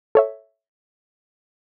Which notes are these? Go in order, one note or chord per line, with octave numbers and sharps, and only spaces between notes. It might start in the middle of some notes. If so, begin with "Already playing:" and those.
A4 C#5 E5